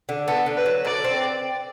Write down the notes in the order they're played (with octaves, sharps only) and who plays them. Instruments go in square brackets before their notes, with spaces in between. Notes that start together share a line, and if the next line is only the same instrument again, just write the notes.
[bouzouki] D3
[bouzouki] B3 [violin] A4
[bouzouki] D3
[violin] B4
[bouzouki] F#3
[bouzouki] A4 [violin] D5
[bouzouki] C4